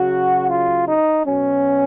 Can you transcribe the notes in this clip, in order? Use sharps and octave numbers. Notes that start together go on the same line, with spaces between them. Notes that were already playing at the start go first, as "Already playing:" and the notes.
Already playing: C#3 F#3 F#4
F4
D#4
B2 F#3 C#4